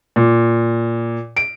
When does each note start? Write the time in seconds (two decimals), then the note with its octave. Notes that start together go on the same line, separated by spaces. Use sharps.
0.16 A#2
1.37 D7